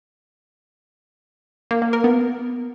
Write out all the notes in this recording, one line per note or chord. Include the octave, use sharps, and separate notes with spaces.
A#3
A#3
A#4
B3